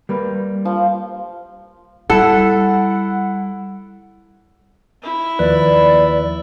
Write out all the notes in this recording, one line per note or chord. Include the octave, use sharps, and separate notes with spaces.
G3 A#3 B4
F3
G3 E4 A4 F#5
E4
D#2 F3 B4 D5